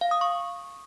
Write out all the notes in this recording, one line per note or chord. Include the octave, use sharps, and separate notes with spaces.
F5
D#6
C#6